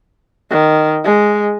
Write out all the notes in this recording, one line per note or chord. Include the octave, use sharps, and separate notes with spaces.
D#3
G#3